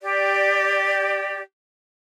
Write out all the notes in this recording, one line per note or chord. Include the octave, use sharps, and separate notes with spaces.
G4 D5